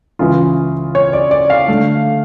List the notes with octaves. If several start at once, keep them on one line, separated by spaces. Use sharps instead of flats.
C#2 C#3 E3 F4
C#5
D5
D5
F5
D3 A3